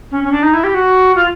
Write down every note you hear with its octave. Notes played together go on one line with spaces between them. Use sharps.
C#4
C#4
D4
D#4
E4
G4
F#4
F4